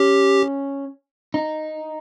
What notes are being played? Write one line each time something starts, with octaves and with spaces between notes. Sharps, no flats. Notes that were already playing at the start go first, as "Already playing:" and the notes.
Already playing: C#4 G4
D#4